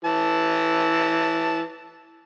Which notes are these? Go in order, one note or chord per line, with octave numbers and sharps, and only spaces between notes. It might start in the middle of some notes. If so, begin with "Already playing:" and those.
E3 A5